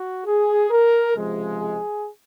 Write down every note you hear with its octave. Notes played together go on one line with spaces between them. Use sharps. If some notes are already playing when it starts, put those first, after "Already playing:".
Already playing: F#4
G#4
A#4
C#2 C3 F3 G#3
G#4